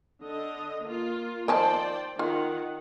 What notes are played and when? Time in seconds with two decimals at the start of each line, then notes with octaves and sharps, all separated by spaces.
0.23 D3 D#5
0.84 A#3 F4
1.48 D#3 F3 C5 D5 G5 A5
2.19 D#3 F4 F#5